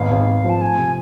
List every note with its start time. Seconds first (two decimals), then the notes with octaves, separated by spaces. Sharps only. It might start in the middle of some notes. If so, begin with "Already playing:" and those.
Already playing: G#1 B3 F5
0.11 G#1
0.27 G#1
0.44 F3
0.49 A5
0.61 A3 G#5
0.78 C3